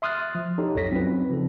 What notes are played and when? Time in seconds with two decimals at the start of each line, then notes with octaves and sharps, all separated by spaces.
0.02 E5 C6 D#6 F6 F#6 A6
0.35 F3
0.58 D#4 G4 A4 C#5
0.75 B1 F2 C#5 A#6 B6
0.91 F#3 C4 C#4 D#4 F4 B4
1.30 C#3 F3 C4 A4